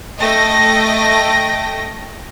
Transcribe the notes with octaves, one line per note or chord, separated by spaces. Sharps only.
A3 D#5 G5 A#6